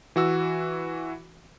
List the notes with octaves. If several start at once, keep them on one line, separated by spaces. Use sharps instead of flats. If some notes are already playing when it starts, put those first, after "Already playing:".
E3 F#4 E6